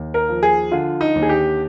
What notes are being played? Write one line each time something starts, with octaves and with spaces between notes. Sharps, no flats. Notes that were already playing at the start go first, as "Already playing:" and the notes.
Already playing: D#2
A#4
F3
G#4
D3 F4
D#4
D#2
G#4
G4